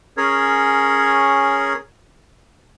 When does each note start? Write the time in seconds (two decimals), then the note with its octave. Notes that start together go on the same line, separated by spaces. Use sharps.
0.17 C#4 G#4 A#4 C#5